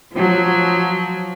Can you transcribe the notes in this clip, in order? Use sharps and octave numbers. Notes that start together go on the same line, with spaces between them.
F3 F#3